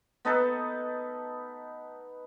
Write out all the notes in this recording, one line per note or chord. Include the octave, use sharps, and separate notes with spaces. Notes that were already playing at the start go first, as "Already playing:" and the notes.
B3 D#4 A4 B4